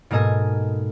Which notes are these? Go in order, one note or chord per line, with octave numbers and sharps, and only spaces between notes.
G#2 B2 A#3 A4 D#5 G#5